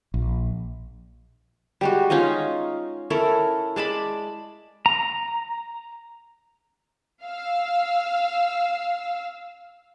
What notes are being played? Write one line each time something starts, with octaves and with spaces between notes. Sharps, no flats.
A#1
G3 G#3 F#4
C#4 D#4 F4 D#5
C#4 E4 A4 A#4
G#3 D5 A5 B5
A#5
F5 E6